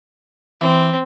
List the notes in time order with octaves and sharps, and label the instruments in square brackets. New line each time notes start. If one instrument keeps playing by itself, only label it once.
[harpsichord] E3 [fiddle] C4